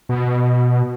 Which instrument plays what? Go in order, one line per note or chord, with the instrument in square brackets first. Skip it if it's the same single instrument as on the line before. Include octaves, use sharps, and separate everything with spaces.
[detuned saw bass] B2